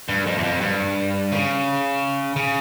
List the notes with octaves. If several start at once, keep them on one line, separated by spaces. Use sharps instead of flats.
G2
F2
E2
F2
G2
C#3
C#3